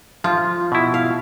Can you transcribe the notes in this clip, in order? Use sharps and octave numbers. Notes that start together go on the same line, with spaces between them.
F3 F4
B2 E4
F5